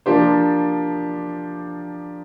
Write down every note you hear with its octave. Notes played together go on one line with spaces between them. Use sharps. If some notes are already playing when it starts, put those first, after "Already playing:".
F3 A#3 D4 G4 C5